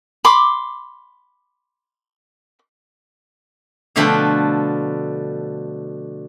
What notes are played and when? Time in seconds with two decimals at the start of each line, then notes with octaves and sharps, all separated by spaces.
0.25 B5 C6 D6
3.96 B2 D3 F3 A3 B4 G5